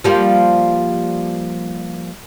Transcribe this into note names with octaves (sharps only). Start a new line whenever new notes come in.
F3 G3 A#3